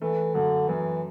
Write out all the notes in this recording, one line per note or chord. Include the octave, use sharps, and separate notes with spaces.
E3 A3
F#2 D3
F#2 E3